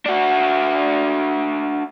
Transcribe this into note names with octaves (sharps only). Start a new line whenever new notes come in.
D4 F#4